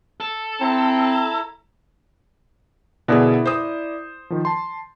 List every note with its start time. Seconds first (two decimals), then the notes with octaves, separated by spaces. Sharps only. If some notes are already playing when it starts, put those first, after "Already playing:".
0.20 A4
0.61 C4 E4 A#5
3.08 B2 D3 E4 G#4 A#4 D5
3.45 C5 D#6
4.30 D#3 F3
4.45 A5 C6